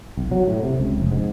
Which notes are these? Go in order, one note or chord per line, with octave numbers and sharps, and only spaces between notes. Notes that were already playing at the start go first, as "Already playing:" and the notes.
B1
F#3
A2
C3
C#2
F1
G#2